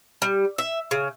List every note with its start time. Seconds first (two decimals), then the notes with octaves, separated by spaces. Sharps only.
0.22 G3
0.58 E5
0.91 C#3